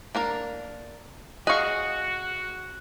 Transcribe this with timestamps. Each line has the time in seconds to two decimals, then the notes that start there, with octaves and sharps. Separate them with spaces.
0.15 A#3 D4 A#4
1.47 F#4 G#4 D#5 F5 C#6 F#6